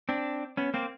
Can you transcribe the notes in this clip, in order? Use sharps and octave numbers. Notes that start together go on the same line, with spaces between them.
C4 D4
B3 C#4
A#3 C4